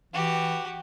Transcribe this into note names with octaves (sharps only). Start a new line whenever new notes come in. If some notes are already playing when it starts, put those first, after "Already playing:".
E3 F#4 G4